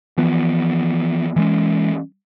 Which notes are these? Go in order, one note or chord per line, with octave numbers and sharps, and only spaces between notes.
E3 F3 B3
E3 G#3 C#4